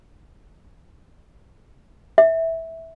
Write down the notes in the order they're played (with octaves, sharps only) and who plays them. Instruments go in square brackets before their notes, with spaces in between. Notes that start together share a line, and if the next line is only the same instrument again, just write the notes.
[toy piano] E5